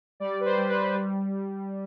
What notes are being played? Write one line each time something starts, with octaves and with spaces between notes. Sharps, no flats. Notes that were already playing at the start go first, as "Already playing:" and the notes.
G3 D5
B4
C5
G3
B4
G3